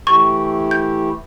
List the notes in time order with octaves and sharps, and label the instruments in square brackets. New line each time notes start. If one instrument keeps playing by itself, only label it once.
[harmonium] E3 A3 E4 G4 [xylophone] C#6
[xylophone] G6